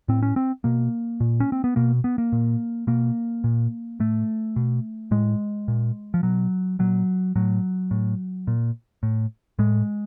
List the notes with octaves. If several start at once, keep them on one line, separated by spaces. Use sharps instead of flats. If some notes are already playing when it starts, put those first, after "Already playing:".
A2 C4
C#4
C4
B2 A#3
A#2
C#4
C4
B3
B2 A#3
B3
A#3
A#2
B2 A#3
A#2
A2 A3
B2
A2 G#3
A#2
F3
B2 F#3
A#2 F#3
A2 F#3
A2
A#2
A2
A2 G#3